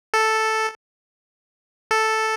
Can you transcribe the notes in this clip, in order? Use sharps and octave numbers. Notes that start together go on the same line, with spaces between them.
A4
A4